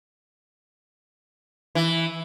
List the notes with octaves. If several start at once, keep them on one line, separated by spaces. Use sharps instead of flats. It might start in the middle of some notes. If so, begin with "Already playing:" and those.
E3